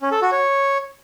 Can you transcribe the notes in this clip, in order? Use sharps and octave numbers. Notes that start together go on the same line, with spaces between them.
C#4
A4
F#4
C#5